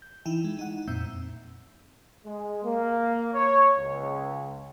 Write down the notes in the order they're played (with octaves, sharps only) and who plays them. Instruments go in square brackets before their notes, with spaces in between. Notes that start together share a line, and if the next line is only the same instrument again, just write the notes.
[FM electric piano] G6
E3 D#4 E4 G5
G#3
D#4 F#5
F2 A#2 C4 E5 E6 G6
[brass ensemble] G#3
A#3
C#5
C#2